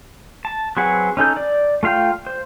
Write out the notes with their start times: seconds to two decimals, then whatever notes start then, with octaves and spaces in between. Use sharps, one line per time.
0.45 A5
0.77 F#3 C4 G#4 B4 F#5
1.17 C#4 D#4 A4 G6
1.37 D5
1.83 A3 F4 F5 G5 G6
2.27 C5